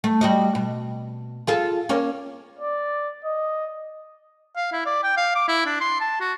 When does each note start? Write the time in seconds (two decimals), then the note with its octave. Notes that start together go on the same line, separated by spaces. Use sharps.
0.04 A3
0.21 G3 F#4 D#5
0.55 B2
1.47 F4 G#4 A4
1.89 A#3 C#4 C#5
2.59 D5
3.24 D#5
4.56 F5
4.72 E4
4.86 D5
5.03 G5
5.17 F5
5.35 D6
5.48 E4
5.66 D4
5.80 C6
6.00 A5
6.20 F#4